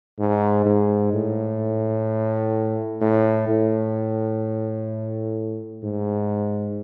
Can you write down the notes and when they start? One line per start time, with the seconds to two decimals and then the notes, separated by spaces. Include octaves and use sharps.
0.19 G#2
0.66 G#2
1.13 A2
3.01 A2
3.48 A2
5.83 G#2